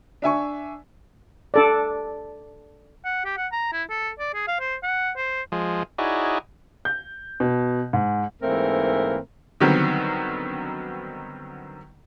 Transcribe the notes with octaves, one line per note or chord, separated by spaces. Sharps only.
D4 E5 G#5 C#6
D4 A4 D5
F#5
G4
F#5
A#5
E4
A4
D5
G#4
F5
C5
F#5
C5
F3 G#3
D#4 E4 F#4 G#4 C#5 D5
G6
B2
G#2
G#2 E3 A3 A#3 C4 A#4
D3 D#3 F#3 G3 B3 C4